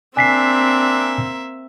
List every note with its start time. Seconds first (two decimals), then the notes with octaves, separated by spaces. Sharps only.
0.17 A#3 C4 D4 E5 G#5 B6 C7